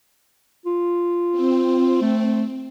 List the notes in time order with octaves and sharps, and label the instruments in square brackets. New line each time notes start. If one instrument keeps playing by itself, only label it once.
[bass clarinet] F4
[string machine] C4
[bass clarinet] A3